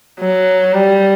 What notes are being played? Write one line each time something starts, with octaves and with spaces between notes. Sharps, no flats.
F#3
G3